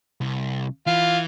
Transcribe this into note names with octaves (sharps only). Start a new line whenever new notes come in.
C2
E3 F4